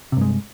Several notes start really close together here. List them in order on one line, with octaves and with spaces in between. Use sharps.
C3 G2 G#3